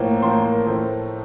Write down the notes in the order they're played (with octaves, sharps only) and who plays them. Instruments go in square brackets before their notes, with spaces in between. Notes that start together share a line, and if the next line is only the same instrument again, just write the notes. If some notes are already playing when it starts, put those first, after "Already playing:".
Already playing: [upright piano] A2 F3 A#3
A2 F3 A#3 C5
A#4
A2 F3 A3